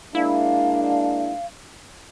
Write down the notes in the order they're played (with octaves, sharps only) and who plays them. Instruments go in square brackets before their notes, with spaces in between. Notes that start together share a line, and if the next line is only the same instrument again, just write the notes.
[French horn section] G#3 A#3 D4 [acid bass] E4 [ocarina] F5